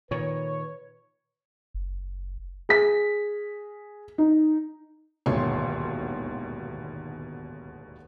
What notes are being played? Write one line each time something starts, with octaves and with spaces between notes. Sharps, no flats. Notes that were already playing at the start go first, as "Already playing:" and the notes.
A#2 D#3 B4 C#5
F#1
G#4 B6
D#4
D#1 G#1 D2 B2 C#5 C6